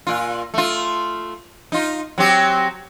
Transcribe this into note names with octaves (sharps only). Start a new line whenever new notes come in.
A#2 F4
A3 F4
D#4 F4
F#3 C4 G4